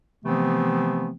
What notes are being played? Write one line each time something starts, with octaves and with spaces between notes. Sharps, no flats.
C3 E3 F3 A3 B3 C4